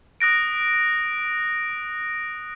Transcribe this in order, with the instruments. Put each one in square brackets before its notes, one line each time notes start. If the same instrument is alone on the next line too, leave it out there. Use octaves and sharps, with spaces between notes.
[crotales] D#6 F#6 A#6 D7